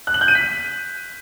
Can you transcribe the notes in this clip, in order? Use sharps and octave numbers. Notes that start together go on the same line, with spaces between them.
F#6
F#7
G6
D#7
B6